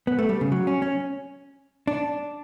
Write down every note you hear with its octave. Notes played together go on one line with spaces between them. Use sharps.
B3
A3
G3
C#3
F#3
C#4
C#4
D4